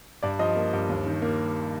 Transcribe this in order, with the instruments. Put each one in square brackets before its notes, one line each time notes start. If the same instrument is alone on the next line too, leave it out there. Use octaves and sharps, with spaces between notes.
[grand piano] G2 D5
F3 D#5
A#3
G2
D#2
D#3
A#3